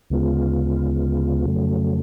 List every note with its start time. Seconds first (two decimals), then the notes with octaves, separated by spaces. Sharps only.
0.10 D2 C#3 G#3 B3 F4
1.45 F2 C#3 F#3 A3